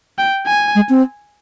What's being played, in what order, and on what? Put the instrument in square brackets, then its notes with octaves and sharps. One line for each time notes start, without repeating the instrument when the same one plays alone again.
[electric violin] G5
G#5
[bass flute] G#3
C4